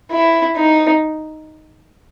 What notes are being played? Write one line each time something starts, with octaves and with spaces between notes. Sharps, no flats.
E4
D#4